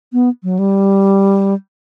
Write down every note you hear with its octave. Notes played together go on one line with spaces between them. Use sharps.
B3
F#3
G3